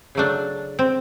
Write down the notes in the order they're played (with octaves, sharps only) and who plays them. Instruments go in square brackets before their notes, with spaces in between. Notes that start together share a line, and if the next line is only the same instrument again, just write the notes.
[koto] C#3 F#3 A3 D4
C4